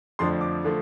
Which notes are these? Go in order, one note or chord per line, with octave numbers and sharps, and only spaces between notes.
F2 D3 F3 A3 D4 C6
D6
D3 F3 A3